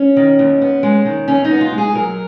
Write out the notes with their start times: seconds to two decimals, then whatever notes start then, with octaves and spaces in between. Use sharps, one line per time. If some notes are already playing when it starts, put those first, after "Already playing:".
Already playing: C#4
0.17 D#3
0.39 D#2
0.61 B3
0.83 G#3
1.05 D#3
1.28 D#2 C#4
1.44 D#4
1.50 B3
1.61 F4
1.73 G#3
1.78 G#4
1.94 F#3 A#4